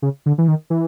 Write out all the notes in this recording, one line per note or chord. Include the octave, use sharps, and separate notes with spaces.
C#3
D3
E3
D#3
E3